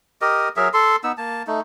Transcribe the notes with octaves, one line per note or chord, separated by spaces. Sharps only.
G4 A#4 D#5
F#3 G#4 A#4 E5
A4 C6
B3 D#4 E6
A#3 A5
A3 D#4